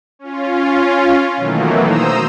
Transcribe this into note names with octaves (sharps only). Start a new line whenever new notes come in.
C#4 F4
B2 D#3 E3 F#3 A3 A#3
C5 A#5 D#6 E6